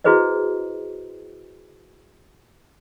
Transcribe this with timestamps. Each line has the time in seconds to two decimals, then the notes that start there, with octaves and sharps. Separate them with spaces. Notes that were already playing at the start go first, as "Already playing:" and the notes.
0.04 E4 F#4 G#4 B4 C5 D#5